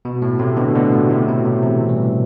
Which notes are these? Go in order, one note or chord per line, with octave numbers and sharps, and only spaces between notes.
B2
A2
A2 C3
B2 D3
B2 D3
A2 C3
A2 C3
B2
A2 C3
C3 E3
E3 G3